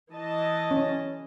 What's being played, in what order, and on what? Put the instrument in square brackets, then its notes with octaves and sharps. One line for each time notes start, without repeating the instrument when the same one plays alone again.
[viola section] E3 D#5 A5
[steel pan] C#4